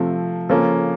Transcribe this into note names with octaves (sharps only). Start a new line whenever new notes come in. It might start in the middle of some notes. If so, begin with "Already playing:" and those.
Already playing: C3 F3 A3
C#3 F3 A#3 C#4 A4